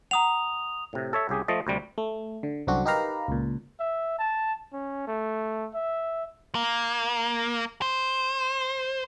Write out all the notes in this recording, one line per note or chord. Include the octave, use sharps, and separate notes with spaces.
F#5 A#5 D#6 F7
A2 C3
A4 C#5 E5
C2 C#3 G4 G#4
F3 A3 D#5 A5
D2 C3 G3
A3
D3
C2 F#2 D3 C4 D4 F#4
D#4 G4 A#4 B4 F5 A#5
C#2 A#2
E5
A5
C#4
A3
E5
A#3
C5